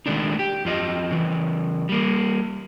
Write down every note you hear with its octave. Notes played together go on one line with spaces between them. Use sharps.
D#3 G#3 A3 D4 D#4
G4
F2 F4 D#5
C#3 E3
G3 A#3